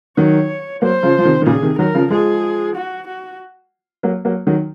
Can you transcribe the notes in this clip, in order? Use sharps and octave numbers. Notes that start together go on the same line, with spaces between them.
D#3 F#3 C#5
F#3 A#3 C5
C#3 F3
F3
C3 D#3
D#3
A#2 C#3 G#4
C3 D#3
D#3 F#3 A#4
C#3 F3
F3 G#3 G#4
F#4
F#4
F#3 A#3
F#3 A#3
D#3 F#3